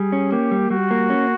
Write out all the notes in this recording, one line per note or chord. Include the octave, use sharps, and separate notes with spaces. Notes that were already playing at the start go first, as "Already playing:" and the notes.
Already playing: G3 G#4
C#4
A#3 G4
G3
G3 F#4
A#3
C#4